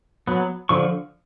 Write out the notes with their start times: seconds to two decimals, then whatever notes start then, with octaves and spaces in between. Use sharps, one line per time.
0.28 F#3 B3
0.69 D3 F3 C#6